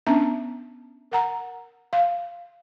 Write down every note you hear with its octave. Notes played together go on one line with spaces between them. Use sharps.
B3 C#4 D4 E5 A5 A#5
A#4 F#5 A#5
F5